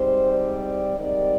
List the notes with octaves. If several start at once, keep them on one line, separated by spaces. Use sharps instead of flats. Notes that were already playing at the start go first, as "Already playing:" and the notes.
Already playing: G#2 G3 C4 C5
D5
G#2 D#3 G3 C4 D5